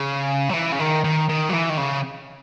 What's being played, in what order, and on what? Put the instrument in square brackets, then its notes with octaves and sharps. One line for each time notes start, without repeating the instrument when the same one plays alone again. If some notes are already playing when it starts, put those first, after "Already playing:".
Already playing: [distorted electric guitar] C#3
F#3
E3
C#3
D#3
D#3
D#3
F#3
E3
D#3
C#3